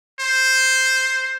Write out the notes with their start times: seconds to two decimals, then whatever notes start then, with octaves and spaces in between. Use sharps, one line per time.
0.20 C5